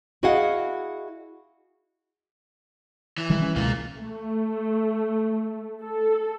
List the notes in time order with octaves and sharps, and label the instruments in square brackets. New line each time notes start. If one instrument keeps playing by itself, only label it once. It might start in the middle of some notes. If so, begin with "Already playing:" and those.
[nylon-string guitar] E4 F#4 G#4 D#5 F5 F#5
[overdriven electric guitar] E3
[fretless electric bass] D#3 G3 G#3
C#4
[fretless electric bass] C#2 B2 G#3 [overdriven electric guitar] A#3 F4
[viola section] A3
A4